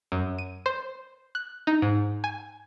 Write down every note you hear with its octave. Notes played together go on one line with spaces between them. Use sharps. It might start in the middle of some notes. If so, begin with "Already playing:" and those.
F#2
D#7
C5
F#6
D#4
G#2
G#5